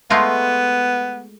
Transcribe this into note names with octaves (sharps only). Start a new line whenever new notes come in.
G#3 A3 B3 F4